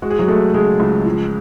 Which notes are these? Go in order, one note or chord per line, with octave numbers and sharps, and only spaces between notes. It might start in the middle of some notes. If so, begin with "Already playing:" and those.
G#3 F#4
G#4
F#3 F#4
G#3 A3 A4
C#3 G#3 G#4
C#2
F3